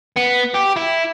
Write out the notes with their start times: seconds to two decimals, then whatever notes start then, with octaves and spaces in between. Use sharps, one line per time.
0.16 B3
0.54 G4
0.76 E4